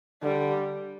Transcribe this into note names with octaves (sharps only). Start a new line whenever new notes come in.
D3 G3